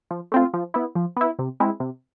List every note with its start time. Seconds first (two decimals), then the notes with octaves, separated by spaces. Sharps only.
0.11 F3
0.32 A3 C4 F4
0.54 F3
0.74 B3 E4
0.95 F3
1.17 B3 E4
1.39 C3
1.60 G#3 C4 E4
1.80 C3